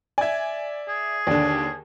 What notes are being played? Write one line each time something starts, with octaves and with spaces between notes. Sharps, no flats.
D5 E5 G#5 G#6
G#4
D#2 D3 D4 D5